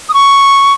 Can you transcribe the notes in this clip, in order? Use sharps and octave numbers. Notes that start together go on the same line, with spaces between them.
D#6
C#6